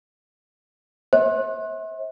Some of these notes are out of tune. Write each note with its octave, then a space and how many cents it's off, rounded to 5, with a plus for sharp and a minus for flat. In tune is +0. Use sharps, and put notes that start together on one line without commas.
C5 +35 E5 -35